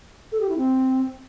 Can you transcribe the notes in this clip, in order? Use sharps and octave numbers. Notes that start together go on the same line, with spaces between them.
A4
G4
E4
C4